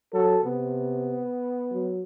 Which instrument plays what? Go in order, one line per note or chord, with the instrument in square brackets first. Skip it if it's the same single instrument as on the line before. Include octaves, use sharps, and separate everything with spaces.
[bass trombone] F#3 [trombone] A4
[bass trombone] C3 [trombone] B3
[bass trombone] F#3